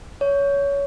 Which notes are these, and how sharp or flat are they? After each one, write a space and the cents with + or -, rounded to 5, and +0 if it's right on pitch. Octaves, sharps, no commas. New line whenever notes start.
C#5 +20